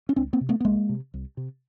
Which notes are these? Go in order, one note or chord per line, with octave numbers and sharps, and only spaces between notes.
C#4
C#2 C4 D4
A#3 C4
C3
A3 B3
B3
C2 G#3 A#3
C3
C2
C3